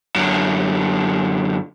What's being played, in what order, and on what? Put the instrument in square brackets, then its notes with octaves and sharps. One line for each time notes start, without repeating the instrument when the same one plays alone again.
[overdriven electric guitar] F#2 D3